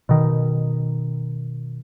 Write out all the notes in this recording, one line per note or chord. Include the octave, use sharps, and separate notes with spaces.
B2 D#3